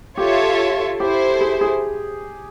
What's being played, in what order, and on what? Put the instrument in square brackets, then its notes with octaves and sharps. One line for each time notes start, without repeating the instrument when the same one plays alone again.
[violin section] F4 A4 C#5 E5 [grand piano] G4
[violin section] E4 A4 C5 [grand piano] G4
[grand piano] G#4
G#4